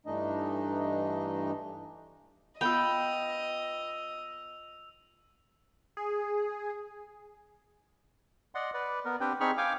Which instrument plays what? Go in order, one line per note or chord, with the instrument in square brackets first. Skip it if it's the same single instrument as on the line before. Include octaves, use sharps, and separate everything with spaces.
[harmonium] G2 E3 A3 D4 D#4 D#5
[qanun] B3 F4 [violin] D#5 [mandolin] G5 [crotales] E6 F7
[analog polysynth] G#4
[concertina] D5 D#5 F#5 C6
B4 D5
B3 A#4
C4 D4 G4 B4 C5 G5
C4 D#4 G#4 B5 C#6 F6
F5 G5 G#5 D6